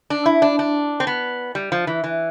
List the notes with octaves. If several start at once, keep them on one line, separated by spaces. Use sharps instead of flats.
D4
E4
D4
D4
C4
B3
G3
F3
E3
E3